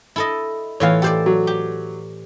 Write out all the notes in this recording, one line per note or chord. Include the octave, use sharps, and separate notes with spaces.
E4 A4 D#5
A2 E3 F4 C#5 F5
G4 A4 C5 D5
F#3
G4